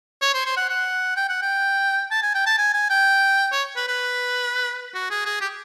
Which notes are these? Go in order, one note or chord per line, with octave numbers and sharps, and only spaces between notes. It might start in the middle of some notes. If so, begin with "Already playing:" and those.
C#5
C5
C5
F#5
F#5
G5
F#5
G5
A5
G#5
G5
A5
G#5
G#5
G5
C#5
B4
B4
F#4
G#4
G#4
G4